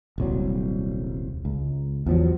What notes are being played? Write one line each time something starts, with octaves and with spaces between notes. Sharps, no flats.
D#1 C2 F#3
C#2
E2 F3 F#3